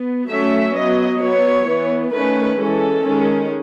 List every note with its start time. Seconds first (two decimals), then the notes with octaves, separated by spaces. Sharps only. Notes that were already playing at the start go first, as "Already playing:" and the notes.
Already playing: B3
0.28 F#3 A3 C#4 E5
0.74 F#3 B3 D#5
1.20 F#3 B3 C#5
1.66 E3 B3
2.12 D#3 A3 C#4 B4
2.57 E3 G#3 C#4 A4
3.04 D#3 G#3 C#4